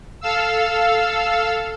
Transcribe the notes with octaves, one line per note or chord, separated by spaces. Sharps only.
A4 F5 E6